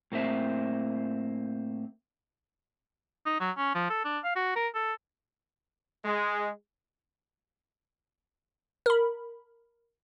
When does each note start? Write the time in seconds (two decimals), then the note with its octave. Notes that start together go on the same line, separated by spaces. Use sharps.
0.12 A2 A#3 C4 E5
3.26 D#4
3.40 F#3
3.57 C#4
3.74 F3
3.89 A4
4.04 D4
4.24 F5
4.36 F#4
4.56 A#4
4.74 A4
6.05 G#3
8.86 A#4 B5